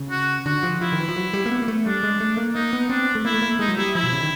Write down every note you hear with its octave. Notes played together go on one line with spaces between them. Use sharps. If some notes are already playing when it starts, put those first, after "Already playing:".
Already playing: C#3
F#4
D3 F#4
F3
F3 E4
D#3
E3
F3
F#3
G3
A#3
B3
A#3
A3
G3 D4
G#3
A3
A#3
A#3 D#4
B3
C4 D4
A3
A#3 E4
A3
A#3
G#3 D#4
F#3
G3 E4
F3 E4
B2
C#3
D#3